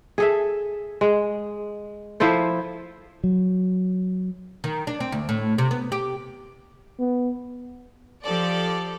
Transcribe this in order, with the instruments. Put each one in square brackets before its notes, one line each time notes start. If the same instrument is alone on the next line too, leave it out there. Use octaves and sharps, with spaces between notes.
[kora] G#4 A4 E5
G#3
F3 E4 A4 C5
[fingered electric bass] F#3
[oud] D#3
D4
C4
D2
A2
C3
B3
G4
[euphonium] B3
[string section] F3 G4 A4 D5